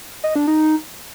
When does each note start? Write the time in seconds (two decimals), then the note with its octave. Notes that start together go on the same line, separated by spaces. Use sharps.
0.24 D#5
0.36 D4
0.47 D#4